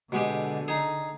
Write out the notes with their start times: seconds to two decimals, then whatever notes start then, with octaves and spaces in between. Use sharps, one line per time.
0.12 B2 D3 G#3 G4
0.68 D#4 G#4